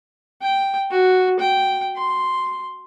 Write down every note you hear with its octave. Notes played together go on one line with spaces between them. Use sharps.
G5
F#4
G5
C6